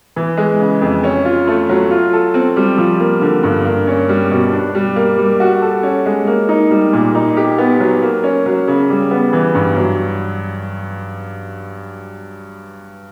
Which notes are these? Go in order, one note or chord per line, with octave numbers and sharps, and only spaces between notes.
E3
G#3
C#3
F2
C#4
F4
A3
F#3
F4
A4
C4
G3
F3
A#3
D3
G2
A#3
C#4
G3
B2
D4
G3
A#3
G3
F#4
A4
C#4
G#3
A#3
D#4
G3
A#2
D#4
G4
B3
F#3
A#3
C#4
F#3
C#3
G3
B3
E3
G2
F#3